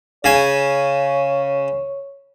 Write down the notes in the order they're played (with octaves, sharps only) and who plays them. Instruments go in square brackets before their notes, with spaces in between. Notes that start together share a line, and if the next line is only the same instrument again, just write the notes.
[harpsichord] C#3 G#5 [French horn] C#5